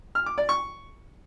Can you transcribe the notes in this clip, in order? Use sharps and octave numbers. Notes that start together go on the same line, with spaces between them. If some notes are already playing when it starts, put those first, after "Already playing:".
F6
D6
D5
C#6